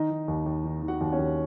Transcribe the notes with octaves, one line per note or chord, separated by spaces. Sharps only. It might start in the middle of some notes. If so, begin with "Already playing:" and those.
Already playing: D#3 D#4 D#5
D#3
D#2
D#2
D#3
D#3
F#4 F#5
D#2
C#4 C#5
D#2